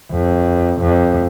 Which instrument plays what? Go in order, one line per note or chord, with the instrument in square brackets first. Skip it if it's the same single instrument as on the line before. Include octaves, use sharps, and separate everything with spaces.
[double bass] F2
F2